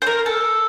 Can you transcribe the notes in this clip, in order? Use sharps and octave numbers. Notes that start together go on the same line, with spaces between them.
C5
A#4
A4